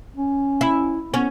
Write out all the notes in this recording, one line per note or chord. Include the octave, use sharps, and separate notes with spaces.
C#4
E4
B3 C#4